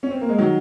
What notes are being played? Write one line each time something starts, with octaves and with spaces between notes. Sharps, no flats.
C#4
C4
A#3
G#3
D#3 F#3